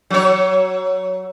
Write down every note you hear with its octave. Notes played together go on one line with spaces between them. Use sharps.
F#3 C#5